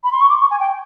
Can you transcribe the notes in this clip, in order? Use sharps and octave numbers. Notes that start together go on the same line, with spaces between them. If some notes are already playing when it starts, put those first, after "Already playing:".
B5
C6
C#6
D6
C#6
G#5
G5